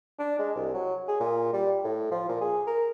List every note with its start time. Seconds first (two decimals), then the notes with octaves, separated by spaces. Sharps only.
0.19 D4
0.39 G#3
0.56 C2
0.74 F#3
1.08 G#4
1.20 A#2
1.53 G3
1.84 A2
2.11 F3
2.29 A#2
2.41 G#4
2.67 A#4